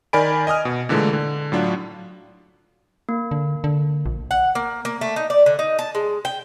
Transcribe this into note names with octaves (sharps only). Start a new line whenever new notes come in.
D#3 A#4 D5 G#5 B5 D7
D#5 G#5 D#6 F6
B2
A#2 D3 E3 G#3 A3
D3
A2 F#3 D4 F4
A#3
D3
D3
A#1
F#5
A#3
A#3
A3
D#4
D5
D3
D#4
A5
G#3
G5